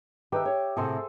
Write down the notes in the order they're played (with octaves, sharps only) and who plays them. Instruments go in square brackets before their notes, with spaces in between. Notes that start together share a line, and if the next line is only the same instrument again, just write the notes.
[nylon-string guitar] D#3 A4 B4 [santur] G4 E5
[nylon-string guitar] C#5
[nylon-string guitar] A2 C3 F#5 [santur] G#4 A4 C5